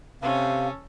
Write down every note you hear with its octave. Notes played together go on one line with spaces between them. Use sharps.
C3 C#4 A4 F5